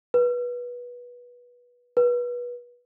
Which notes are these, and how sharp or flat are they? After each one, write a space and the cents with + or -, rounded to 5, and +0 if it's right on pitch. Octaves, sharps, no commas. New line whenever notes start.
B4 -20
B4 -25